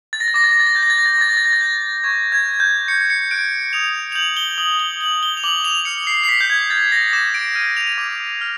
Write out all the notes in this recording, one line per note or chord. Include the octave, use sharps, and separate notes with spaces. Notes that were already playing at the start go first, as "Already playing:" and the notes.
A6
A#6
A6
D6 A#6
A6
A#6
A6
A#6
G6 A6
A#6
A6
A#6
A6
A#6
D6 A6
A#6
A6
A#6
A6
G6
C#6 G#6
G#6
F#6
G6
C#6 C#7
C#7
F#6 D7
D#6 F7
F7
G6 F#7
G7
D#6 F#7
G7
G6 F#7
G7
F7
D6 F#7
F7
F6 C#7
C7
C7
D6 B6
G6
G#6
F6 A6
A#6
D6 E7
D7
F6 D#7
F7
D6
F6